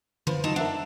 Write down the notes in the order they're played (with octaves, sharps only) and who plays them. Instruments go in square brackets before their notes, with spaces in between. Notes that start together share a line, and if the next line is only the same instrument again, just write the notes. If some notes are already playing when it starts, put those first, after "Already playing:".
[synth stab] D3 B4 C5 [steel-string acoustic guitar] F3
[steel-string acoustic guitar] F#3 D#4 A5
[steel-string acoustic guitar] D4 [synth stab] A#4 E5 F#5